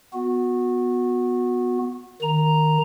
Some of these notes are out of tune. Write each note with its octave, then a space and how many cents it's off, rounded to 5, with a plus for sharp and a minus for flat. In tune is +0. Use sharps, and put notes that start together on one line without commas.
B3 +0 F#4 -25
D#3 -15 A#5 +0